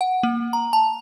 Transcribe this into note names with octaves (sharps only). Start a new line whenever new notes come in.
F#5
A#3
A#5
A5